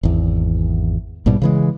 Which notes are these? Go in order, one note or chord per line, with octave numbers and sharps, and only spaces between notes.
G#1 E2
A#1 G#2 B2 G3
C#3 E3 G#3